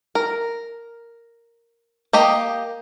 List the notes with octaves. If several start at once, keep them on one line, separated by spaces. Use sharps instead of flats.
A#4
A#3 G4 D#5 A#5